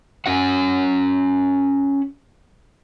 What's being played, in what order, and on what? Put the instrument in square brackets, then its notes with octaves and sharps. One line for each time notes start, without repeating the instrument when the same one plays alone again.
[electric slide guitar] C#4 F#4 F#5